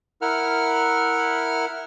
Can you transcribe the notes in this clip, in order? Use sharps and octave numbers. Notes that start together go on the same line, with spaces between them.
E4 A#4 F#5 F6